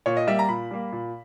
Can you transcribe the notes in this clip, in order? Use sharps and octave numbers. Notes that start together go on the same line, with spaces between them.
A#2 C#5
D#5
G3 A#3 E5
A#5
A#2 B5
G3 A#3
A#2